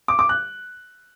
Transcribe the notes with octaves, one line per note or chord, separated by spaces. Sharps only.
D6
D6
F#6